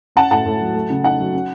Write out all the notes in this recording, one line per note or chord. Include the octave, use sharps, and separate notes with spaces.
C#4 F#5 A5
A2 F#5 A5
A2
F#3
A3
C#3
D#4 F#5
F#3
C#4